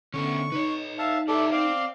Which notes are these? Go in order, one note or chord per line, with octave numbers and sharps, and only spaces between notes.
D3 A3 B3 C#4 C#6
D#4 B4 C#5
E5 F5 A5
G4 A4 B4 D5 E5
C5 D5 F5 G5